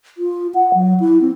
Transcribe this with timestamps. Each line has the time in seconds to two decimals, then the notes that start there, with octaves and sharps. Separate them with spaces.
0.18 F4
0.55 F#5
0.74 F#3
1.00 E4
1.21 C4